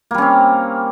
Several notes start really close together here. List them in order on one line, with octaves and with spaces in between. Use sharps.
A#3 G3 C#4 C4